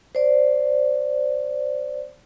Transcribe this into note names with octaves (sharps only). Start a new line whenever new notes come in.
C5 D5